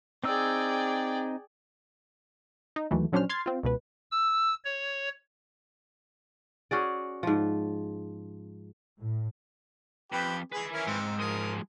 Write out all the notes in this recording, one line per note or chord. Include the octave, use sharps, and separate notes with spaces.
C4 D#4 G#4 D5 G5 E6
D#4
D#2 E3 F#3 A3
A#1 F#3 C#4 D4 C5 F6
C6 F6 G#6 A6 C7
C4 F4
C#2 B2 B4
E6
C#5
C#4 F#4 G#4 D5
G#2 F3
A2
F2 G4 B4
G#3 G#4 B4 G#5
C#4 E4 A#4
G#2 C4
F3 G#3 A#4 D#6